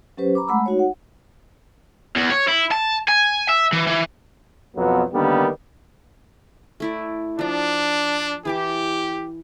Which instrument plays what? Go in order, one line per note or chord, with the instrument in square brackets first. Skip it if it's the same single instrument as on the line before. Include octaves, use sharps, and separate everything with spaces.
[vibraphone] F#3 C#4 G4 B4 C5
A#5 B5 D6
G#3 A3 F#5 B5 E6
D#4 F#4 C#5
F#5
[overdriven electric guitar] E2
C#5
E4
A5
G#5
E5
E3
E3
[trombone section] F2 B2 F#3 B3
D3 D#3 G3 A#3 B3
[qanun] A3 E4 D5
[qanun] F3 A#5 [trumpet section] D4
[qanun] E3 A5 D6 [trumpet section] G4